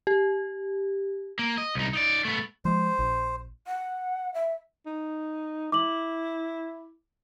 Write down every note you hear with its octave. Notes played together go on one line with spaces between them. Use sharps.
G4
A#3
D#5
C2 D#4
D#4 D5
A3 B3
F3 G#3 C5
A#1
F#5
E5
D#4
E4 D6 F#7